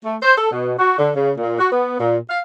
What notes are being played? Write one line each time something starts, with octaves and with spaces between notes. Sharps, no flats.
A3
C5
A4
B2
F#4
D3
C#3
A#2
F#4
B3
A#2
F5